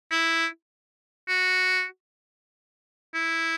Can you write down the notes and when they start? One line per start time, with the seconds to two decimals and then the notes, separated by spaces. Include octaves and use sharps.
0.11 E4
1.28 F#4
3.14 E4